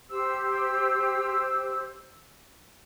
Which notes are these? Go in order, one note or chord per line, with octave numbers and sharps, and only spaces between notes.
G4 C5 E6